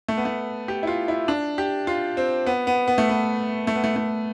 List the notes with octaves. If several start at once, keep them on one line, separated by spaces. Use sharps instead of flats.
A3
B3
A3
G4
E4
F4
E4
D4
G4
F4
C4
B3
B3
B3
A3
B3
A3
B3
A3
A3